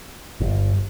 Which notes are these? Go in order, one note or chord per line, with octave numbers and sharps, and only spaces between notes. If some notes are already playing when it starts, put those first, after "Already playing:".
G1